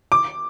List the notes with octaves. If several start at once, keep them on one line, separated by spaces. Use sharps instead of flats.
D6